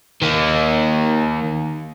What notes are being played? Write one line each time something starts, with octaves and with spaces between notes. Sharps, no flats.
D#3 A#3